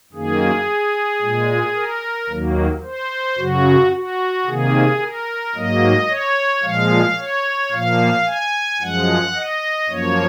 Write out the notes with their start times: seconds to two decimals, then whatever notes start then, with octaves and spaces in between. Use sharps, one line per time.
0.13 F#2 D#3 A#3 G#4
1.21 A#2 G#3
1.75 A#4
2.29 D#2 D#3 F#3 A#3
2.84 C5
3.38 F#2 C#3 F#3 F#4
3.92 F#4
4.46 C3 D#3 A#3 G#4
5.01 A#4
5.55 G#2 F#3 A#3 D#5
6.09 C#5
6.63 A#2 F3 G#3 F5
7.18 C#5
7.72 A#2 F3 A#3 F5
8.26 G#5
8.81 F#2 F3 G#3 F#5
9.35 D#5
9.89 F#2 F3 A#3 C#5